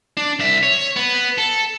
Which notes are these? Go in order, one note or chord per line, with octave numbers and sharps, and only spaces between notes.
D4
C2 E5
C#5
B3 B4
A4